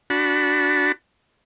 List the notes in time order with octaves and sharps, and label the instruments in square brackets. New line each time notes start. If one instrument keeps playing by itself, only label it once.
[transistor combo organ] D4 F#4 A5 B5